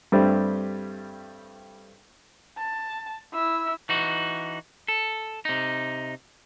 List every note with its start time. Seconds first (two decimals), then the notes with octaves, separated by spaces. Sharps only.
0.12 G2 G3 A3 C4
2.58 A5
3.34 E4 E6
3.89 E3 D#4 F#4
4.88 A4
5.45 C3 D#4